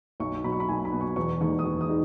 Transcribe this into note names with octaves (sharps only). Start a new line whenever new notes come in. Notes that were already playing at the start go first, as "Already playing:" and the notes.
B1 C#6
B2 F#3 B5
C#6
B5
B1 G#5
B5
B2 F#3
C#6
E1 C#6
D#2 D#3 G#3 D#4 C#6
D#6
E1 C#6
D#6
D#3 G#3 D#4